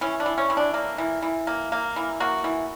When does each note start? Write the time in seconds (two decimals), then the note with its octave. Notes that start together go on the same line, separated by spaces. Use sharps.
0.01 E3 C#4
0.20 D4
0.26 E3
0.38 C#4
0.50 E3
0.57 D4
0.74 A#3
0.98 E3
1.22 E3
1.47 A#3
1.72 A#3
1.96 E3
2.20 A#3 F#4
2.44 E3